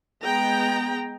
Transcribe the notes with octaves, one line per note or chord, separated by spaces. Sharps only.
G#3 B3 G5 A#5